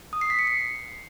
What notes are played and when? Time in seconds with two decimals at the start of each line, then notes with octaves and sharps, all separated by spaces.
0.13 D#6
0.21 C7
0.30 B6
0.39 C#7
0.47 C7